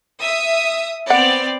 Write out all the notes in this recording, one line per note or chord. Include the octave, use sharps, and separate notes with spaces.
E5 D#6
B3 C4 D5 F#5